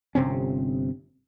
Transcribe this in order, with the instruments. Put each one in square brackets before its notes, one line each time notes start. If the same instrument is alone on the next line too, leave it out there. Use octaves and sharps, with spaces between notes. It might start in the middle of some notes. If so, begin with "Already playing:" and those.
[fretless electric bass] G1 C3 C4 C#4